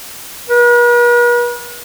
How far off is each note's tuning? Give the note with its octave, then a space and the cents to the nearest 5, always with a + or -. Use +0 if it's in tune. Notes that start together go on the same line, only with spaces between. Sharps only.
B4 -45